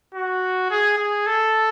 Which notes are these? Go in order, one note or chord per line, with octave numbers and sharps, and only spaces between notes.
F#4
G#4
G#4
A4